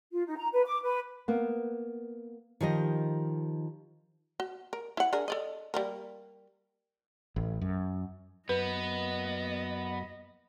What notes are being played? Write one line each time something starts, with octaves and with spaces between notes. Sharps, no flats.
F4
D#4
A#5
B4
D6
B4
A#3 B3
D#3 F3 G4 D#5
F#4
A#4
E4 F#5
D4 G#4 A#4
A4 D5 D#5
G3 A#3 A#4
A1
F#2
F#2 A#3 B3 B4 D#5